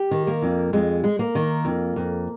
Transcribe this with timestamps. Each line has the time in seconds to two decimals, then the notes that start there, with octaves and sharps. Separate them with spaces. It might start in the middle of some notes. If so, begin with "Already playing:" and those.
Already playing: G4
0.11 D#3
0.27 A#3
0.42 F2
0.73 F2 G#3
1.04 G#3
1.19 A#3
1.35 D#3
1.65 F2
1.96 F2